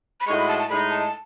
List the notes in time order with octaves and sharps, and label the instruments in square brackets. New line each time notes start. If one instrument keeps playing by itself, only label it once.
[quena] B5
[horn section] A2 G#3 D#4 F#4 [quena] C#6
[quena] B5
A5
A5
[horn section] A2 G#3 D#4 [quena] B5
[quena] A5